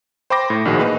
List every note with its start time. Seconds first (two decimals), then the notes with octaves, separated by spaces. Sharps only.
0.30 C5 G5 B5 C6 D6 A#6
0.50 A2
0.65 A#1 D#3 F#4 G#4
0.80 A#3 D#4 B4